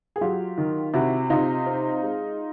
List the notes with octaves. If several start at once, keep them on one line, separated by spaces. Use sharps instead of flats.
G#4
F#3 F4 G4
D#3
C3 E4 F#4
C3 D#4 F4
C4
G#3